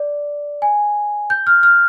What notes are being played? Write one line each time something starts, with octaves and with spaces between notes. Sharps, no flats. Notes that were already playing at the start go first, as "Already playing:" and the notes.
Already playing: D5
G#5
G6
F6
F6